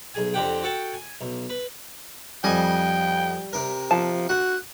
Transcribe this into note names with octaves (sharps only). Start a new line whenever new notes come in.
B1 G#4 G#5
F2 D3 C4 G4 F#5 G5
F#4 A4 F#5 G5 A5
G#5
B1
B4
F2 G3 D#5 G5 G#5
C3 A#4
F3 A5
F#4 F#5